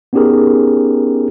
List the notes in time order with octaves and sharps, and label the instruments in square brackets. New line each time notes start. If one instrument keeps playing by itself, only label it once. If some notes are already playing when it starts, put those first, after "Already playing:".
[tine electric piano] B3 C#4 D#4 G4 G#4 A#4